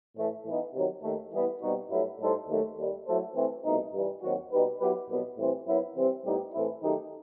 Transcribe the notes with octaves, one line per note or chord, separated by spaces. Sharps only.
A2 E3 A3
A2 E3 B3 D#4
C3 D#3 F#3
D#2 D#3 A3
E3 G3 B3 E4
B2 G3 C4 D#4 F#4
G2 F#3 A3 E4
A2 G3 D#4 A4 C5
D#2 D#3 F#3 A3
D#2 D#3 G3
F#3 A3 E4 A4 C5
E3 A3 C4
C2 B2 A3 D#4
G2 E3 G3
D#2 D#3 F#3 C4 F#4
B2 G3 D#4 G4 B4
F#3 B3 E4 G4 B4
C2 B2 F#3 B3
A2 E3 G3 C4
F#2 F#3 B3 E4
C3 E3 G3 C4
A2 G3 B3 D#4 G4
A2 E3 A3 C4 E4
F#2 D#3 A3 D#4 G4